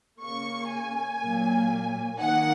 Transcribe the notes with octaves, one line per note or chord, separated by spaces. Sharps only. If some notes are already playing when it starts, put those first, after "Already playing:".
C#3 A#3 C#6
G#5
A#2 F#3 A#3
D#3 A#3 F#5